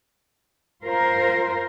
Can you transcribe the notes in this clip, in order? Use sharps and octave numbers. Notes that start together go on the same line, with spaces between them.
F4 A#4 C5